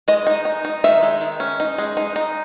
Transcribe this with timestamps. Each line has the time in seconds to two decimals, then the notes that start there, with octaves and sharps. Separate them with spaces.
0.08 G#3 D#5
0.27 D#4
0.45 D#4
0.65 D#4
0.84 D#3 E5
1.02 G#3
1.21 D#3
1.40 C#4
1.60 D#4
1.78 G#3
1.97 D#4
2.16 D#4